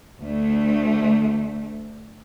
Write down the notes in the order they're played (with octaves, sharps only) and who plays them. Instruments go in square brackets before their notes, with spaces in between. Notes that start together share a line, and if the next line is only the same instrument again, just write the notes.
[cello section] D2 A3